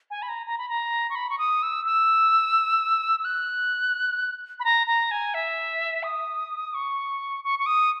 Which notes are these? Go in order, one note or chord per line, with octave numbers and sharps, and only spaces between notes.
G#5
B5
A#5
A#5
B5
A#5
C#6
B5
C#6
D#6
E6
E6
E6
F#6
B5
A#5
A#5
G#5
E5
D#6
C#6
C#6
C#6
D#6